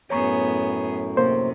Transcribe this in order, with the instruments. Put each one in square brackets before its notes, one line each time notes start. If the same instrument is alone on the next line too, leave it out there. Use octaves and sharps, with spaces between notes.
[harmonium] F#2 A2 [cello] B3 G#4 [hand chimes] C#5 A#5 C#6
[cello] C3 [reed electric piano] A#3 C5